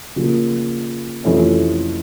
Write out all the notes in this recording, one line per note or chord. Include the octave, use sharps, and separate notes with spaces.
C#3 F3 A#3
F2 C3 E3 A3 C#4